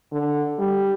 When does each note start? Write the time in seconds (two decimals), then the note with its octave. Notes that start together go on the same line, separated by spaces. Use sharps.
0.12 D3
0.59 G3